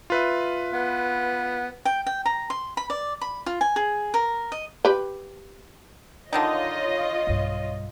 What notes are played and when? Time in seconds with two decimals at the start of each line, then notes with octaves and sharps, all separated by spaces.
0.10 F4 B4 E5
0.74 B3
1.85 G5
2.06 G5
2.26 A#5
2.50 C6
2.77 B5
2.90 D5
3.21 B5
3.46 F4
3.61 G#5
3.76 G#4
4.14 A#4
4.52 D#5
4.85 G4 B4
6.33 D3 D#3 D#4 F4 C#5 D#5
7.27 B1 G2